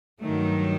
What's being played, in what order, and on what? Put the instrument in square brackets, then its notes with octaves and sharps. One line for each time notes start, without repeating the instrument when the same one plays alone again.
[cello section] G2 D#3 F#3 A3